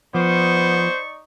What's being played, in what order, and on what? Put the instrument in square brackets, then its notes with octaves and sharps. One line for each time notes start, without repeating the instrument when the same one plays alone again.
[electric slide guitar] F3 [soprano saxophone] B3 [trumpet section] D#4 D5 C#6 [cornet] C5